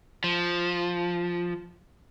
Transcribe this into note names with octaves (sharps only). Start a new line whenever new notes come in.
F3